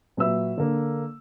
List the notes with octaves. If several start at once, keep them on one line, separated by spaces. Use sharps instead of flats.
A#2 F#3 B4 E5 E6
D3 A#3